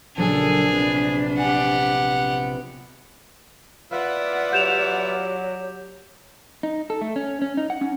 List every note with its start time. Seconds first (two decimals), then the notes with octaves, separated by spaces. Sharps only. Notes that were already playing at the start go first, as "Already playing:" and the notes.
0.17 A#1 C#3 F#3 D4 G#4 A4 G#5
0.72 C3 B3
1.38 G4 F#5 G#5
3.91 F4 B4 D5 E5 F#5
4.53 F#3 G4 G6 E7 F7
6.63 D#4
6.90 A4
7.01 A3
7.16 C#4
7.42 C#4
7.57 D#4
7.70 F#5
7.81 C#4